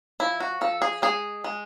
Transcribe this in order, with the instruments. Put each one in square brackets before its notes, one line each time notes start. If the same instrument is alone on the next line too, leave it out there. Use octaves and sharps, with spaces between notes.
[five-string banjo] F3 E4
F#4
F3 A4
G#4
G#3 G#4
G#3